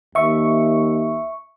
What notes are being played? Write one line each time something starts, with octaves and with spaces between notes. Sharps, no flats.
D#2 E5 C#6